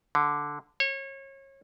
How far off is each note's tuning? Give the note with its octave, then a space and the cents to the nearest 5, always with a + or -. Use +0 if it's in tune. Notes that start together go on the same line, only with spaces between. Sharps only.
D3 -5
C#5 -30